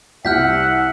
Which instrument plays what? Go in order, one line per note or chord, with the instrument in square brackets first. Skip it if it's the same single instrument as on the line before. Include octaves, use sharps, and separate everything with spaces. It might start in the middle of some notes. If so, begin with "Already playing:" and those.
[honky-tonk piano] C2 [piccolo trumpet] E5 [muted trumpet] F#5 [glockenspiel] F6 G6 B6